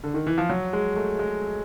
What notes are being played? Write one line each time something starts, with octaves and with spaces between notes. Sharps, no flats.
D3
D#3
E3
F3
F#3
G#3
A3
G#3